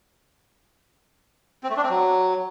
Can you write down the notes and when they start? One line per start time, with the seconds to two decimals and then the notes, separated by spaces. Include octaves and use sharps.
1.64 C4
1.70 A3
1.77 D4
1.83 C4
1.90 F#3